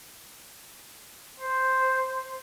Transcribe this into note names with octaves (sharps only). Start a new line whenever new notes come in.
C5